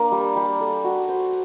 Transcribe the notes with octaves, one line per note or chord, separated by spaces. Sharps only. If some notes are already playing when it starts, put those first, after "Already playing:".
Already playing: A#3 D4
G3
G3
A4
F#4
C5